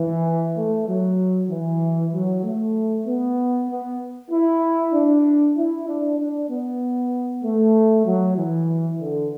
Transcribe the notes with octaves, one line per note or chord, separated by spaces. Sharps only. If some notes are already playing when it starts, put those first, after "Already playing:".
Already playing: E3
A3
F#3
E3
F#3
A3
B3
B3
E4
D4
E4
D4
D4
B3
A3
F#3
E3
D3